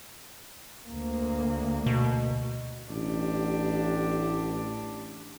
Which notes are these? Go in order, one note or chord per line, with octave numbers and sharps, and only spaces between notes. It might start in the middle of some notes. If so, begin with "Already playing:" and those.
D2 A#3
B2
A1 D4 G4